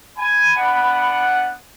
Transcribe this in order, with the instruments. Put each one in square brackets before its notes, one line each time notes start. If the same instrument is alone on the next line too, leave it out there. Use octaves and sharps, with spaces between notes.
[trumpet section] G#5 [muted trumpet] B5
[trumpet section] B3 D4 F#5